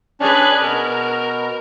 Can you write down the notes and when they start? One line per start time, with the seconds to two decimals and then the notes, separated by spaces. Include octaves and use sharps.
0.20 C#4 D4 G#4 B4
0.62 B2 A#4